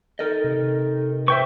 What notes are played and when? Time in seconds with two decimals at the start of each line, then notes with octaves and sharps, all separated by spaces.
0.19 D#4 A4 A#4 D#5
0.44 C3
1.28 B4 C5 E5 G5 C#6